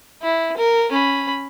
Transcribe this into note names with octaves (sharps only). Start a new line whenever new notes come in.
E4
A#4
C#4 B5